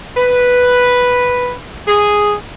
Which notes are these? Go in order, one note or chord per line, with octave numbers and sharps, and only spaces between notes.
B4
G#4